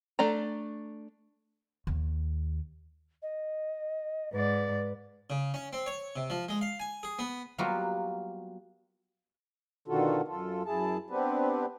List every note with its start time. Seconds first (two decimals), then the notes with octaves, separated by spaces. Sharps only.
0.19 A3 D4 D5 A#5
1.87 D#2
3.22 D#5
4.33 G#2 B4 D5
5.30 C#3
5.54 C#4
5.73 C4
5.86 C#5
6.16 C3
6.30 F3
6.49 G#3
6.61 F5
6.80 G#5
7.03 G#4
7.19 B3
7.58 F#3 G3 A#3 B3 F4 F#4
9.88 B2 D3 D#3 F4 F#4 A4
10.28 F#2 F4 A4
10.66 F#2 E4 G#4 A5
11.10 B3 C4 D4 G4 B4